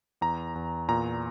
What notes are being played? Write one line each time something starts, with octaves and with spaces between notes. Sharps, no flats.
E2 A#5
E2
A#2 A#5